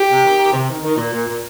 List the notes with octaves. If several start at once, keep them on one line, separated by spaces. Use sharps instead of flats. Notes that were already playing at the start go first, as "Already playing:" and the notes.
Already playing: G4
C3
D#3
D#3
C3
D#3
D#3
A#2
A#2
A#2